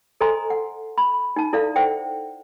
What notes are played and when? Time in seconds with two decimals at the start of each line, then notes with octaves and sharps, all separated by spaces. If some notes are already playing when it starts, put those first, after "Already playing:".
0.21 A4 C5 D#5 G#5 A#5 C6
0.50 F#5
0.98 B5
1.36 D#4 A5
1.53 E4 A4 D5 E5 F5
1.76 C5 E5 F#5 G5